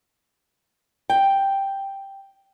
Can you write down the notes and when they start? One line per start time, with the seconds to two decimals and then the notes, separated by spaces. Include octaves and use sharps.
1.10 G5